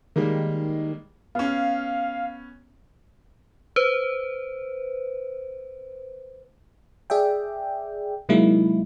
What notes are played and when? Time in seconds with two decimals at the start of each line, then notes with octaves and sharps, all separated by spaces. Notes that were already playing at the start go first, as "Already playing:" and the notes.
0.16 D#3 G3 G#3 A#3
1.35 B3 C#4 F5
3.76 B4 C5
7.10 G#4 D5 E5 G5
8.29 C3 F#3 G#3 A#3 D#4 E4